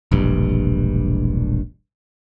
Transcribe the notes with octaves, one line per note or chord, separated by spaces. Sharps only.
E1 A#1 G2